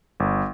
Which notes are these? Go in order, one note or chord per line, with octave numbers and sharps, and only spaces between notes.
G1